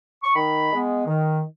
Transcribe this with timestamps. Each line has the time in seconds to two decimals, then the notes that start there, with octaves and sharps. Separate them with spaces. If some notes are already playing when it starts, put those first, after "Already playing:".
0.23 C#6
0.35 D#3 B5
0.72 G#3 B3
1.07 D#3